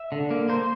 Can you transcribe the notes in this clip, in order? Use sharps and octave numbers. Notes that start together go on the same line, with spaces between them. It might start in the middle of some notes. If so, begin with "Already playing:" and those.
Already playing: E5
D3
A#3
A#3 C5